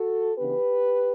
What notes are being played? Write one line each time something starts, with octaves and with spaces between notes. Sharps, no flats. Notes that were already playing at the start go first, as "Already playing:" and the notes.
Already playing: F#4 A4
C#3 E3 B3 D4 G4 B4